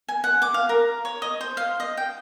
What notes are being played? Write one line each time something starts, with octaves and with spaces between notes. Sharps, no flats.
G#5
F#5
D6
F5
A#4
C#5
D#5
C5
F5
D#5
G5